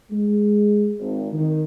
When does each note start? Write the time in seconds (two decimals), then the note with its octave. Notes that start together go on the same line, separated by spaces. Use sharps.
0.10 G#3
0.99 G#1
1.32 D#3